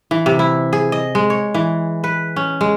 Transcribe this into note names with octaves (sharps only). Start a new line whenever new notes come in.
E3
C3
E4
G#4
D#5
G#3
C#5
E3
B4
C#4
G#3